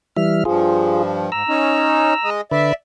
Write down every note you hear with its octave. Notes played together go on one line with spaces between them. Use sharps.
E3 G3 E5 F6
G2 F3 F4 G#4
G#2 A#5 E6
C#4 D#4
G#3 D#5
D3 B4 D5 E5